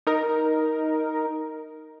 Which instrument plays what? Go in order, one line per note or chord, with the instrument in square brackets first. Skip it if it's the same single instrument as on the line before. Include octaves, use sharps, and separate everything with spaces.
[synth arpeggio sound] D#4 A#4